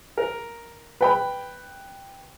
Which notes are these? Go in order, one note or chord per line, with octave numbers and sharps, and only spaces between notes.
A#4
B4 G5 B5